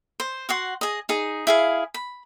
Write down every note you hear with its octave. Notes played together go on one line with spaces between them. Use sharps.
C5
F#4 F#5 C6
G#4 D#5
D#4 G#4
E4 G#4 F5
B5